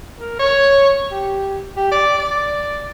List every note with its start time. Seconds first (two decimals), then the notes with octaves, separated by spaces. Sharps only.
0.20 A#4
0.39 C#5
1.11 G4
1.76 G4
1.91 D5
2.18 D5